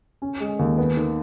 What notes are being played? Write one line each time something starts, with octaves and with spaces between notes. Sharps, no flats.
C#4
G#3
D#2
B3
D#3